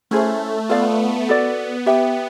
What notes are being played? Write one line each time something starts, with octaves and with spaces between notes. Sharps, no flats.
A3 C#4 E4 G#4 C5
B3 F4 A4 D5 F5
F#4 A4 D5
B3 G4 B4 E5 G5